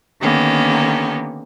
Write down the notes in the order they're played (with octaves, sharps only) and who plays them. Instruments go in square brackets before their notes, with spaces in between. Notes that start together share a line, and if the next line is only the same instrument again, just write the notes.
[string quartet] D3 D#3 A#3 B3 C#4 G4